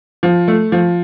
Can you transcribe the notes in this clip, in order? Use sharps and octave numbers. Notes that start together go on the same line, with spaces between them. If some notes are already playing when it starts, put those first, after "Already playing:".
F3
A3
F3